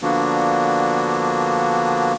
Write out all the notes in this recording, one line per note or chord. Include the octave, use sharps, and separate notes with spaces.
D3 F3 A#3 B3 D4 F#4